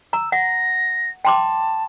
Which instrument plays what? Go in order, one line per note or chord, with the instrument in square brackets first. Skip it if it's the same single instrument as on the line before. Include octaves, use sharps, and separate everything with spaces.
[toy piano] A#5 [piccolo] E6
[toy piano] F#5 [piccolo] A#6
[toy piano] G5 C6 D6 [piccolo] A5